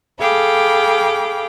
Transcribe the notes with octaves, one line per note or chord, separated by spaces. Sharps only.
G#4 A4 F5 G5 B5 D6